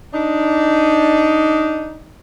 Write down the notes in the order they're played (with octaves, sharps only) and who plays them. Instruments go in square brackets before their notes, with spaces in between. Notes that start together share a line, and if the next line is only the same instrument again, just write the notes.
[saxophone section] D4 D#4